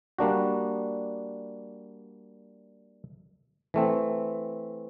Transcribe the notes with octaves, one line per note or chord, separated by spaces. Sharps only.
G3 A#3 D4 F#4
E3 A3 C4